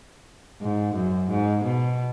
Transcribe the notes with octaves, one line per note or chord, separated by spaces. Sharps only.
G#2
F#2
G#2
B2